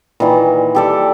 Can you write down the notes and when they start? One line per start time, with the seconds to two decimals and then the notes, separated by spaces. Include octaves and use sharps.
0.20 A#2 D#3 E3 A#3
0.75 G4 A4 D5